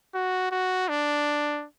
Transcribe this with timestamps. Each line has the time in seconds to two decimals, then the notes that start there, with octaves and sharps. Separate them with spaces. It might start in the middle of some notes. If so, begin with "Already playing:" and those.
0.15 F#4
0.51 F#4
0.88 D4